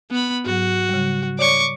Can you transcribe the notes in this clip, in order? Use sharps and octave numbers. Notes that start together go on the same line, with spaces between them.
B3 B5
G#2 F#3 F#4
C#3 G3
C#5 D5 C#6 D6